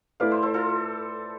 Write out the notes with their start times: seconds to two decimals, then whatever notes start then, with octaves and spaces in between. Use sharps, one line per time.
0.20 A3 E4 B4 D5 F5
0.31 C5 E5
0.43 A4 C5
0.54 F4 A4